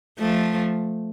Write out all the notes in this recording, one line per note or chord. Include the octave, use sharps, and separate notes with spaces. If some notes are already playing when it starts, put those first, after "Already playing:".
F3 A3